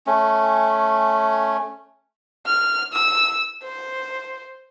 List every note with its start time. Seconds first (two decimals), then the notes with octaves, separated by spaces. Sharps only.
0.07 A3 C#4
2.46 F6
2.94 E6
3.64 C5